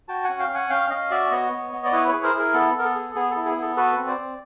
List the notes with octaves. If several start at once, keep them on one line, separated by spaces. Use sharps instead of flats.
F#4 G5 A5
C#4 F#5 G#5
F5 G5
C#4
F#5 G#5
C#4 F5 G5
C#4 D#5 F5
F#4 D5 E5
B3 C#5 D#5
B3
B3
D5
E4 B4 C#5
G#4 B4 C#5
A#4 C5
E4 G#4 A#4
B3 A4
B3 A#4
A4
G#4
B3 G#4
A4
E4
G#4
B3 A4
F#4 A4 B4
C4
C5 D5
C4